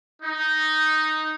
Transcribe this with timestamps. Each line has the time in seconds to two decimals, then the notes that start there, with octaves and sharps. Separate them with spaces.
0.22 D#4